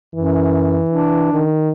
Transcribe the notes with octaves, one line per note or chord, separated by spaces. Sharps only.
F#2 E3
D4
D#3